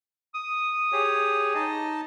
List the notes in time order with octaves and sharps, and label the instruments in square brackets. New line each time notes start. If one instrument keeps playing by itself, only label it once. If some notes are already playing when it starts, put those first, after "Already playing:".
[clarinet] D#6
[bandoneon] G4 G#4 C#5
D#4 D#5 A5